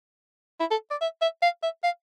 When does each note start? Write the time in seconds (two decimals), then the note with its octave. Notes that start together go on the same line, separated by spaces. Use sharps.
0.60 E4
0.71 A4
0.91 D5
1.01 E5
1.21 E5
1.42 F5
1.63 E5
1.83 F5